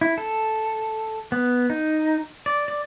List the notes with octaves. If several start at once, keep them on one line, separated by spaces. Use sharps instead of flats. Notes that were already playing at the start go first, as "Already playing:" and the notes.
E4
A4
B3
D#4
D5
D5